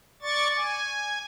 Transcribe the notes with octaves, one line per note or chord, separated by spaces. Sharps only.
D5 C#6 A6
G#5